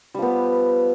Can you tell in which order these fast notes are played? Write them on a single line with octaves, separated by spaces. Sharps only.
G3 F3 B3